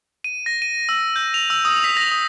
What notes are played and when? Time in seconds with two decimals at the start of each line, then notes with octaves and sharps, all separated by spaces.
0.24 D#7
0.46 A#6
0.62 D#7
0.89 E6
1.16 G6
1.34 F7
1.50 E6
1.65 D#6
1.84 B6
1.97 A#6
2.11 D#6